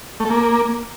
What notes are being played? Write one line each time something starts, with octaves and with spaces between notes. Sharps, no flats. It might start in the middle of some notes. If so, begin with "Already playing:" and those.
A3
A4
A#3